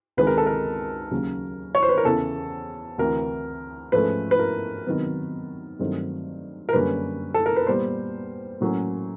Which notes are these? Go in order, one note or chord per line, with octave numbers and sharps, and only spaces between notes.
C#2 C3 D#3 G#3 B4
A#4
A4
A#4
D#2 C#3 F#3
C#5
C5
B4
A#4
E2 C#3 E3 A4
D2 C3 E3 A#4
G#2 F3 A3 C#4 B4
B4
A#4
C3 D#3 F#3 B3
G2 D#3 F#3 A3 C4
A#4
F#2 D3 G3 A#3 C#4 B4
A4
A#4
B4
A#2 G3 B3 C5
A2 F#3 A#3 C#4